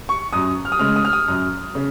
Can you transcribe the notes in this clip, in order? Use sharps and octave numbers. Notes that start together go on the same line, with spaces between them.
C#6
F#2 D#6
F6
D#6
C#3 G#3 F6
D#6
F6
D#6
F#2
C#3